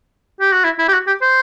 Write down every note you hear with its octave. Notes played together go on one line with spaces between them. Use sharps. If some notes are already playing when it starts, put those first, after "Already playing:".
G4
F#4
E4
E4
G4
F#4
G4
C5